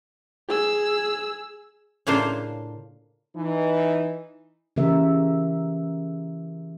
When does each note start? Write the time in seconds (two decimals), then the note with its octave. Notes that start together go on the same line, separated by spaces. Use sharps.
0.49 G#4 E6
2.07 A2 C#3 A#3 D4 F4 C5
3.36 E3 D#4
4.76 C#3 E3 A#3 G4 A#4 E5